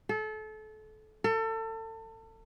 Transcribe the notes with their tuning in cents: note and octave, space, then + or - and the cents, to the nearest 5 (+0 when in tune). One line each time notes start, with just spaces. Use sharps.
A4 -30
A4 +30